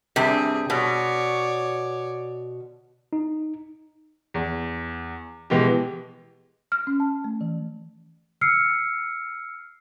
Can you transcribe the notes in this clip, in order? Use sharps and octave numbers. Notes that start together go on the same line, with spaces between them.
G2 C3 G#4
B2 C#5 D5
D#4
E2
B2 E3 G#3 B3 G4
F6
C#4
A5
A3
E3
E6 F6 C7 C#7